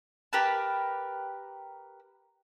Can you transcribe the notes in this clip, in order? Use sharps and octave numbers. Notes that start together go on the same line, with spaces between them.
G4 A#4 B4 A5